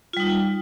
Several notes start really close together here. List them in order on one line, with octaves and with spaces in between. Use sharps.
F4 G3 D#4